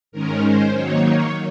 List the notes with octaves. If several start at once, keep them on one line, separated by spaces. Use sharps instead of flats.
G#2 D#3 G#3 C#4 A#4
C5
D#3 F#3 A#3 D#4 C#5
C#5